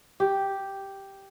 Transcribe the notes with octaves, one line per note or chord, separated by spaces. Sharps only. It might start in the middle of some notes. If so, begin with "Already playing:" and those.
G4